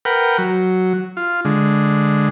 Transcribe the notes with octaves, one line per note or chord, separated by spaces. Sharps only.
A#4 B4 F#5 G5
F#3
F4
D3 G#3